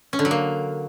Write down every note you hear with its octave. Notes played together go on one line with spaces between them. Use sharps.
C#4
D3
F#3
A#3